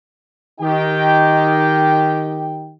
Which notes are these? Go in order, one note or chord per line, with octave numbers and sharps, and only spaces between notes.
D#3 D#4 G4 G5